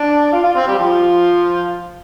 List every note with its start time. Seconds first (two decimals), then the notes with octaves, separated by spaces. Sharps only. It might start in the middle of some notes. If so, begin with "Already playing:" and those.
Already playing: D4 D5
0.32 F4 F5
0.44 F4 F5
0.55 C4 C5
0.67 G3 G4
0.79 F3 F4